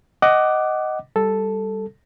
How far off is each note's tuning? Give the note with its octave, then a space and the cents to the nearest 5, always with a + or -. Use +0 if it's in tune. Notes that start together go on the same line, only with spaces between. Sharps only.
D#5 +0 F#5 +20 D6 +0
G3 +0 A4 +0